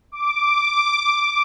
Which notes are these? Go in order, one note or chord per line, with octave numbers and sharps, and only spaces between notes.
D6